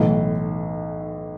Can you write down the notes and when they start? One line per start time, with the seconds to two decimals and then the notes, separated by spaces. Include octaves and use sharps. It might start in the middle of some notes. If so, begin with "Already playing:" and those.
Already playing: B1 A2 E3